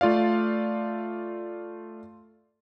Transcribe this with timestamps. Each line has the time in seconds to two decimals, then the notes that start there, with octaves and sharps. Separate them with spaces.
0.01 A3 F4 D5 F5